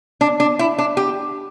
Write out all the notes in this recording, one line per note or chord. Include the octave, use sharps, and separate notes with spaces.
D4
D4
E4
D4
G4